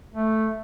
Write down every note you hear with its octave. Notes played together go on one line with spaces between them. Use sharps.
A3